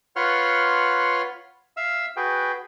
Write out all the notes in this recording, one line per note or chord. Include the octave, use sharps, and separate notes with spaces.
F4 B4 C#5 F#5 C6 F6
E5 F5 E6
F#4 G#4 B4 G5